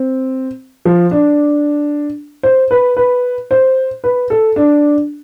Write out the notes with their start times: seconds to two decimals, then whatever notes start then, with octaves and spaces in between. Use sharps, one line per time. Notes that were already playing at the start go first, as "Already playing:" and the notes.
Already playing: C4
0.85 F3
1.11 D4
2.43 C5
2.71 B4
2.97 B4
3.51 C5
4.04 B4
4.30 A4
4.56 D4